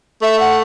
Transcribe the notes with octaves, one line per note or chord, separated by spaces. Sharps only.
A3 E5
F#5